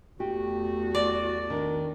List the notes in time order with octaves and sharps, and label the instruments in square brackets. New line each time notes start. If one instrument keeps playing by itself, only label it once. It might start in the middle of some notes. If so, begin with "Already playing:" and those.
[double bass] E2 A3 [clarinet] F#4 [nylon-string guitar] G4
[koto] D5
[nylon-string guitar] D#3 [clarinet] D4